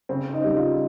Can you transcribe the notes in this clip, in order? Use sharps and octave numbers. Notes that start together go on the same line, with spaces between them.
C#3 C4
D#4
G3
F4